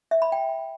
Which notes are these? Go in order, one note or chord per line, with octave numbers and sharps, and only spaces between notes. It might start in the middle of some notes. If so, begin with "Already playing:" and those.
E5
B5
G5